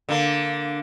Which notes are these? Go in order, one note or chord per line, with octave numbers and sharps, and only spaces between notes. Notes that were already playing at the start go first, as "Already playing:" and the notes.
D3 A#3